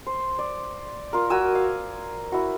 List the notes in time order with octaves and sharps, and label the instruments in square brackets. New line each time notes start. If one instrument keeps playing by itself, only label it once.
[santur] C5
D5
F4 A#4
F#4 A#4 G#5 E6
F5
E4 F#4